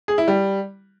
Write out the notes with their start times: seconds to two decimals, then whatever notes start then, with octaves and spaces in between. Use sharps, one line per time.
0.08 G#4
0.18 E4
0.28 G3